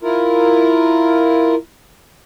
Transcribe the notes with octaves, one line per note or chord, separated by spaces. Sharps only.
E4 F4 A#4